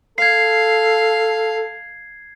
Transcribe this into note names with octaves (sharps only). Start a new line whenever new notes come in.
A4 F5 G#6 C7